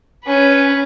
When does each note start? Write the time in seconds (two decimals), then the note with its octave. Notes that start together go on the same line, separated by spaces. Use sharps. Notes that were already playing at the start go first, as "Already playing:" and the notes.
0.25 C#4 B4